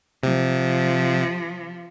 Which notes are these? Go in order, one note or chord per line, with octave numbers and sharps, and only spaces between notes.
C3 F3